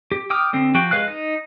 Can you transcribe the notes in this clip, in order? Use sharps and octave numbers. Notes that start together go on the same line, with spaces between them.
G4
G5 D6 D#6 F6
D3 C4
F3 F#4 G4 G5
G#3 B4 F5 F#6
D#4